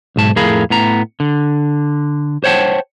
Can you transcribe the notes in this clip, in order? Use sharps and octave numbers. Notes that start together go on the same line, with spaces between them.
B1 G#2 A5
F2 A2 G#4 A#4 F5 B5
A2 B3 A#5
D3
C5 C#5 F#5 G5 A5